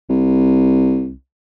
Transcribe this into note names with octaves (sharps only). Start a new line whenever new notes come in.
C2